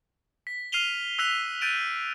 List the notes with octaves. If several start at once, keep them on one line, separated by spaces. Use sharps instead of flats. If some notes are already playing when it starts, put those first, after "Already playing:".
B6
F6 C7 D#7 F7 G7
E6 F#6 B6 F7
F#6 G6 A6 D7 D#7 F7